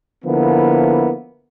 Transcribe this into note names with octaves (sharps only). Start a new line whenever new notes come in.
D3 F3 A#3 B3 E4